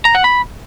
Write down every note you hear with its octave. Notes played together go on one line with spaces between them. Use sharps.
A#5
F#5
B5